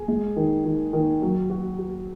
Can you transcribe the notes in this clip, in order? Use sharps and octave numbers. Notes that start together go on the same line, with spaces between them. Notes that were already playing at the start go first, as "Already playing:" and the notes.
Already playing: G#4
G#3
D#3
D#3
D#3
F#3
F#4
F#4